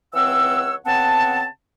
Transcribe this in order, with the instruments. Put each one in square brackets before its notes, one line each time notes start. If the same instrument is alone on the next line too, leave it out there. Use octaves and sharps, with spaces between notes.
[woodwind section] C#2 E3 C4 C#5 F#5 E6
C#3 B3 C4 F#5 A5